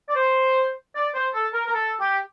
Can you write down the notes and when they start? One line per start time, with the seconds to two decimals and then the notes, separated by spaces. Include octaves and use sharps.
0.09 D5
0.15 C5
0.95 D5
1.14 C5
1.34 A4
1.53 A#4
1.67 A#4
1.74 A4
2.00 G4